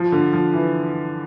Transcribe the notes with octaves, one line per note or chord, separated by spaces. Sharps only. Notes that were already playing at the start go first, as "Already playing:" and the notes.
Already playing: F3
D3
F3
E3